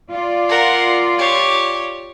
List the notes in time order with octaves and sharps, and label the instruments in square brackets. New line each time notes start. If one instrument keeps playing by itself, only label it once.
[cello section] F4 D5
[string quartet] A#4 F#5
G4 C#5